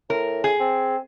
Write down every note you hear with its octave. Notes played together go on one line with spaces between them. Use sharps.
A2 A#4
G#4
C4